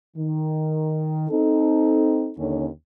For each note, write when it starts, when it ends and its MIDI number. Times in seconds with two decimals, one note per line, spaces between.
0.17 1.27 51
1.30 2.32 60
1.30 2.32 63
1.30 2.32 69
2.38 2.66 39
2.38 2.66 50
2.38 2.66 61